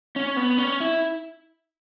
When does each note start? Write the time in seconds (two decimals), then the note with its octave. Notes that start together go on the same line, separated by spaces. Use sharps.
0.16 C#4
0.37 B3
0.58 C#4
0.80 E4